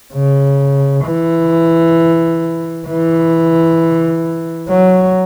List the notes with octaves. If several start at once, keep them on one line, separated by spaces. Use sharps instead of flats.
C#3
E3
E3
F#3